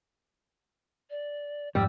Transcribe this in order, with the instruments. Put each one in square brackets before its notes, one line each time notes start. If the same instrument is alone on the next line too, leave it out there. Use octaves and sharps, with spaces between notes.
[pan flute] D5
[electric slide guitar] F2 G#2 [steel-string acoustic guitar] G3 [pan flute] E6